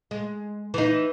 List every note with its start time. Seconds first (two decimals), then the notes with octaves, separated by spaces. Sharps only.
0.11 G#3
0.74 E3 D#4